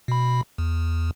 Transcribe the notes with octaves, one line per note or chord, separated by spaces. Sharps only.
B2 B5
E2